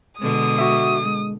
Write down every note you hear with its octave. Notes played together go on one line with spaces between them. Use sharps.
B2 D3 G#3 D#6
F#4 E5
G#3